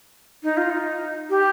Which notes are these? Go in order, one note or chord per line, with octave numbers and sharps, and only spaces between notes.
D#4
F4
D#4
G4